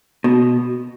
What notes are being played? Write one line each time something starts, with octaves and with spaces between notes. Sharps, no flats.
B2